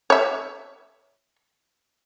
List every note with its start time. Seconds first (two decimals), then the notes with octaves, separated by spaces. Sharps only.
0.10 C#5 E5